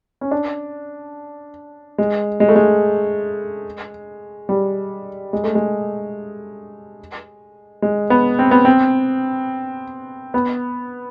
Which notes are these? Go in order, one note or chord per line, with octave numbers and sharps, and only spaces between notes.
C#4
D4
G#3
G#3
A3
G#3
G3
G#3
A3
G#3
G#3
B3
C4
B3
C4
B3